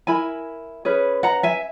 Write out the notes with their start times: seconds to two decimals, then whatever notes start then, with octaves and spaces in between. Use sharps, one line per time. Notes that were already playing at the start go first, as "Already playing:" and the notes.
0.07 E4 A#4 G#5 B5
0.85 C#4 G#4 B4
1.23 F#5 A#5
1.43 E5 G#5